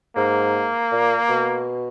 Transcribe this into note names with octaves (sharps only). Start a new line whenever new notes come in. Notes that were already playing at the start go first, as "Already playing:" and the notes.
G#2 A#3
A#2
B2